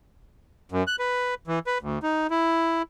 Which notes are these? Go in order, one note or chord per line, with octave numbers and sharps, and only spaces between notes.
F#2
F#6
B4
E3
B4
D2
D#4
E4